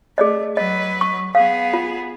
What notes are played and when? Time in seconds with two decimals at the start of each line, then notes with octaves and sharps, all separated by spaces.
0.18 A3 G#4 D5 D#5
0.57 F#3 B4 D#5
1.01 C#6
1.35 B3 G#4 F5
1.73 F4